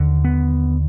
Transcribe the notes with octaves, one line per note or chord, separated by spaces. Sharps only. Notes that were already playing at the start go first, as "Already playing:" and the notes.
Already playing: D#2 D3
B3